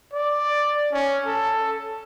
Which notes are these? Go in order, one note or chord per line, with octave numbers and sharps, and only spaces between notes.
D5
C#4
A4